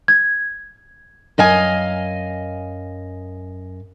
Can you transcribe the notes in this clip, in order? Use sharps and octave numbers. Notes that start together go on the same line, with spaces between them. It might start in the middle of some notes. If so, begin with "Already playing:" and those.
G#6
F#2 D#5 F5 G#5